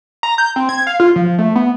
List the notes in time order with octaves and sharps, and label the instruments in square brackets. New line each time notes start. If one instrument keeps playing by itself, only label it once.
[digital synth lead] A#5
G6
C4
G#6
F5
F4
F3
A3
B3